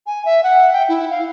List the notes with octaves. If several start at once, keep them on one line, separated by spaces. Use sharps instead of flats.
G#5
E5
F#5
G5
E4
F5